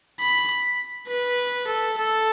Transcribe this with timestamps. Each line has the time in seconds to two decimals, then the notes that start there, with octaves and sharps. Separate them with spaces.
0.20 B5
1.08 B4
1.68 A4
1.97 A4